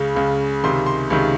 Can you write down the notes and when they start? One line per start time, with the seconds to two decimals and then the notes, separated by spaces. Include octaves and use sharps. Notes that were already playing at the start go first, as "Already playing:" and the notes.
Already playing: C#2 C#3
0.15 C#2 C#3
0.64 C#2 C3 D#3 C6
0.86 C6
1.10 C#2 C3 D#3